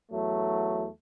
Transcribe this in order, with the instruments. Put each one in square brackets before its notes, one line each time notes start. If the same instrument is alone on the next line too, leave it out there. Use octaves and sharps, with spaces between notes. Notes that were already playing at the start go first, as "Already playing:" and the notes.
[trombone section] E2 F#3 A3